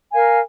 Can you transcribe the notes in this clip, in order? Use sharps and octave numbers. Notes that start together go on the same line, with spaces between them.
A#4 F5 G#5